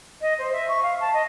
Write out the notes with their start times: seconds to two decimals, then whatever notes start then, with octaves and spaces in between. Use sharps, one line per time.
0.21 D#5
0.38 C5
0.52 E5
0.69 C#6
0.83 F5
1.00 A5
1.13 D#5